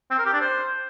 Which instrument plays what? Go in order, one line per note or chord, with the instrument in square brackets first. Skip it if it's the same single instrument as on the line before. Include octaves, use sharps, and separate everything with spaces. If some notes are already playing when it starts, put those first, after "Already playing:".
[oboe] C4
A#4
G4
D4
C5